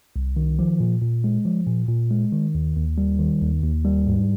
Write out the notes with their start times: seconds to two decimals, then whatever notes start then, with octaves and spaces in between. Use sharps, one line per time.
0.16 C2
0.37 D#3
0.59 F3
0.80 A#2
1.02 A#2
1.24 G#3
1.46 F3
1.67 A#2
1.89 A#2
2.11 G#3
2.33 D#3
2.55 D#2
2.76 D#2
2.98 G3
3.19 D#3
3.41 D#2
3.63 D#2
3.85 G3
4.07 G#2